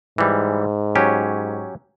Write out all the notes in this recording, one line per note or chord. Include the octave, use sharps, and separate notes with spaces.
G#2 E3 G3
F#3 C#4 G4